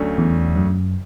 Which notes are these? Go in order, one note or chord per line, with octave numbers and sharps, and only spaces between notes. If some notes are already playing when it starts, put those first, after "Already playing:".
Already playing: D2 D3 F#3 A3 C#4
E2
F#2